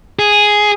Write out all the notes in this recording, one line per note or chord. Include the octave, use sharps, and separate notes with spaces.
G#4